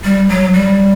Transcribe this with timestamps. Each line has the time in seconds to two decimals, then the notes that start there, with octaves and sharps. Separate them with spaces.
0.04 G3
0.29 F#3
0.53 G3